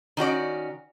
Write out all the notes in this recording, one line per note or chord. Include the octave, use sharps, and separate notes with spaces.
D#3 C#4 F#4 D5